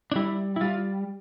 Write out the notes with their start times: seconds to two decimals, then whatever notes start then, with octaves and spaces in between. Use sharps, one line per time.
0.12 D4
0.16 G3 E4
0.56 E4
0.61 G3 F4